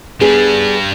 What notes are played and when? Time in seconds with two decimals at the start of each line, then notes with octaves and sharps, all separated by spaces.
0.21 G3 B3 D4 G#4